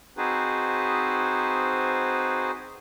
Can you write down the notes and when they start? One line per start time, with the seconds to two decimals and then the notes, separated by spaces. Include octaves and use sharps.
0.17 C4 D#4 F#4 G#4 B4 C5